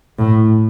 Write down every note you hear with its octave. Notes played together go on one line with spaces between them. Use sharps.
A2